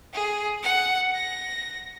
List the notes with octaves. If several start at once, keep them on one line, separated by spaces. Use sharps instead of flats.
G#4
F#5
A#6